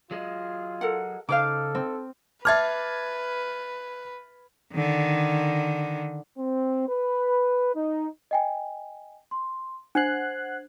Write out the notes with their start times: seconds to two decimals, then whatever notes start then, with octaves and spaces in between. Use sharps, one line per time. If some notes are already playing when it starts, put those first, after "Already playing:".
0.11 F#3 F4 G#4 D#5
0.81 A4 A#4 F#5
1.29 C#3 D#4 A4 C5 F5 D6 F6
1.75 C4
2.45 B4 E5 A5 D6 F6 G#6 A6
4.74 D3 D#3
6.38 C4
6.89 B4
7.75 D#4
8.31 D#5 G5 G#5
9.31 C6
9.95 D4 C5 F#5 F#6 G#6 C7